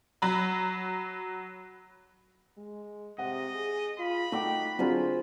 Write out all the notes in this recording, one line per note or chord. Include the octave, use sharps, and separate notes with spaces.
F#3 B5
G#3
C3 D#5 F#5
G#4
F4 B5
A3 D#4 F#4 G5 D6
D3 F#3 C4 D4 F4 G#4 C5